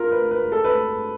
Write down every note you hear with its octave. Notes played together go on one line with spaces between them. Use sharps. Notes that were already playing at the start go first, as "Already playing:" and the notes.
Already playing: F4 A#4
B4
B4
A4
B4